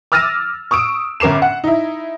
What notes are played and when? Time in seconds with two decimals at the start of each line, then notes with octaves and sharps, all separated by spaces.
0.12 D6 E6 F6 A6 A#6 D#7
0.71 C#6 D#6 E6 D7
1.20 G1 C#4 A#4 D6 C7 E7
1.42 F#5
1.64 D#4 E4